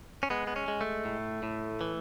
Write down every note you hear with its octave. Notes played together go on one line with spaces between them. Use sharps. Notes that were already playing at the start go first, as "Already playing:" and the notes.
C#4
G#3 B3
B3
C#4
G#3
A3
A2
A2
E3